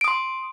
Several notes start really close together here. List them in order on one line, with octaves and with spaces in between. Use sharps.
D7 D#6 C6